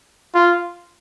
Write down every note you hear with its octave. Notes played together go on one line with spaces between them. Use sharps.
F4